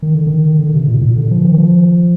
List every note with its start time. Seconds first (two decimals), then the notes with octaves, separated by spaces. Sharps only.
0.02 D#3
0.15 D3
0.27 D#3
0.59 D3
0.74 C3
0.88 A#2
0.96 A2
1.02 A#2
1.16 D3
1.31 F3
1.45 D#3
1.58 F3